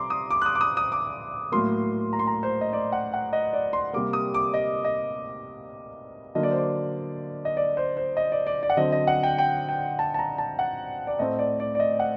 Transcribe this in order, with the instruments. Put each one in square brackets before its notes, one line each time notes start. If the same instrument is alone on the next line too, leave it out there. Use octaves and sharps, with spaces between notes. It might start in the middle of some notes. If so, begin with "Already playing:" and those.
Already playing: [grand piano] C3 G3 A#5 C6 D6
D#6
D6
F#6
D#6
D6
D#6
D#6
D6
A2 F#3 A#3 C6
A#5
C6
A#5
C5
D#5
D5
F#5
F#5
D#5
D5
C6
C3 G3 A#3 D6
D#6
D6
D#5
D#5
D3 F#3 A#3 D#5
D5
C5
D5
D#5
D5
C5
C5
D#5
D5
D5
D5
F#5
D3 F#3 C4 D#5
D#5
F#5
G5
G5
G5
A5
A5
A#5
A5
F#5
D5
A2 A3 C4 D#5
D5
D5
D5
D#5
F#5